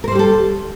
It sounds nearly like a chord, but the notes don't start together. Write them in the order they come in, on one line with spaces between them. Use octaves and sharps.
A#4 C5 G3 G4 A4